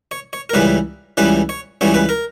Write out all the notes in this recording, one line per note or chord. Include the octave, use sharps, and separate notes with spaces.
C#5
C#5
A#4
C#2 C#3 E3 G3 B4
C#2 C#3 E3 G3 B4
C#5
C#2 C#3 E3 G3 C#5
B4
A#4